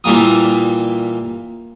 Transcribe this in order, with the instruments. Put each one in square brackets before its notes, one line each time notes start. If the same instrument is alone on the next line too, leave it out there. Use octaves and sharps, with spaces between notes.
[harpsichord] A#2 E3 G3 A#3 D#6